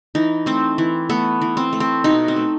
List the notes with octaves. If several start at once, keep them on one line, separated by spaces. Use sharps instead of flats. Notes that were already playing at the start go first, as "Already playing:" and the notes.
E3 D#4
A3 C4
E3
A3 B3
E3
C4
A3
C4
B2 D#4
C4
A3